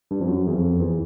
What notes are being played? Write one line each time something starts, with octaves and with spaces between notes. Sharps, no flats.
G2
F2
F#2
E2
F2
E2